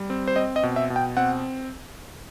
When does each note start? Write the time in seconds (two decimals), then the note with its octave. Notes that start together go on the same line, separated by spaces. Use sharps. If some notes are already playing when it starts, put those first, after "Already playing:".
Already playing: G3
0.10 C4
0.28 C5
0.36 C4 D#5
0.56 D#5
0.63 B2
0.76 E5
0.90 B2
0.96 G5
1.17 C4 F#5